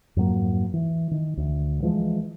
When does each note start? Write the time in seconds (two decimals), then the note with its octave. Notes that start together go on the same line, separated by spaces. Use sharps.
0.16 F2 G#2 F#3 A#3
0.74 E3
1.11 D#3
1.37 D2
1.82 E3 F3 G#3